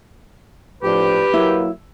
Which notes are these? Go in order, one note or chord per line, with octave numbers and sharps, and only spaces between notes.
A2 F3 D4 G4 B4
F#3 A#3 E4